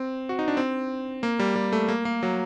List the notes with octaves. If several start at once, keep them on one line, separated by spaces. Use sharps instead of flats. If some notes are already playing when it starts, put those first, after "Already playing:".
Already playing: C4
F#4
D#4
D4
C4
A#3
G3
G3
A3
A#3
A#3
F#3